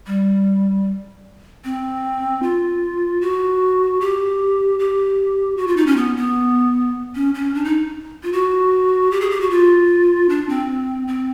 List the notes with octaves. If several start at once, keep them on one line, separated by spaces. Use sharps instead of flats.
G3
C4
F4
F#4
G4
G4
F#4
F4
D#4
C#4
B3
B3
C#4
C#4
D4
D#4
F4
F#4
G4
G#4
G4
F#4
F4
D4
C4
C4